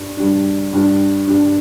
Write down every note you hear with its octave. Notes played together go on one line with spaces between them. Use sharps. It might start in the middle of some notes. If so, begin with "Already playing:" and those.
Already playing: G2 G3 D4
G2 G3 D4
G2 G3 D4
G2 G3 D4